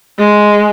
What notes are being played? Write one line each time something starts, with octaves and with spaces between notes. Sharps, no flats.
G#3